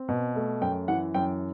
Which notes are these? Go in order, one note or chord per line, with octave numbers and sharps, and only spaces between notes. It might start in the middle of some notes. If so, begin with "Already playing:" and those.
Already playing: C4
B2
A3
F#2 G5
E3 F#5
F#2 G5